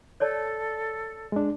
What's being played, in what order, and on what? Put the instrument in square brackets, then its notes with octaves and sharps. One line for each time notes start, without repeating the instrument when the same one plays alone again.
[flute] A4 [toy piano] C#5 D5 A5
[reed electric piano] G#3 D4